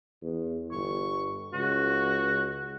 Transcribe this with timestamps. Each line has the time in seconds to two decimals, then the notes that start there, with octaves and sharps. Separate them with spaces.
0.22 E2
0.72 G1 C#6
1.53 C#2 F#4